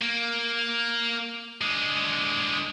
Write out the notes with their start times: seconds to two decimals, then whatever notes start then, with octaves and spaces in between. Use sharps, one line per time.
0.01 A#3
1.62 D3 G#3